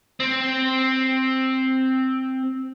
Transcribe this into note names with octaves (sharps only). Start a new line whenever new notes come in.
C4